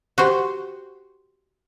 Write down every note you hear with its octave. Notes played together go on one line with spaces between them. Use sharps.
F#4 G4 C5